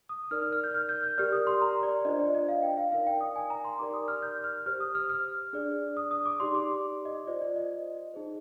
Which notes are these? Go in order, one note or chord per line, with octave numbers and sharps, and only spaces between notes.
D#6
D#4 A#4 D5 F6
F6
F6
G6
F6
G6
G6
G4 A#4 D5 F6
D#6
C6
A#5
D5
D4 F4 C5 D#5
D5
D#5
F5
G5
F5
D#4 A#4 D5 F5
G5
D#6
G#5
A#5
C6
D#4 G4 A#4 D5 D6
D#6
F6
G6
F6
G4 C5 F6
D#6
F6
F6
D4 G#4 D5
D#6
D#6
D6
D#4 G4 D5 C6
D6
D#5
F4 C5 D5
D5
D#5
D#4 G#4 C5